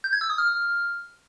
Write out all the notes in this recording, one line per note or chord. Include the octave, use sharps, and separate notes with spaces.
G6
G#6
E6
D#6
F6